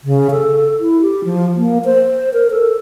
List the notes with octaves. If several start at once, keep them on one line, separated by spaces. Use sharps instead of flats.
C#3
A4
E4
G4
F3
A#3
C5
A#4
A4